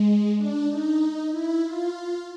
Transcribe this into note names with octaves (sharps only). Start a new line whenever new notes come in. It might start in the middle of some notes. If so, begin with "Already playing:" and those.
Already playing: G#3
D4
D#4
E4
F4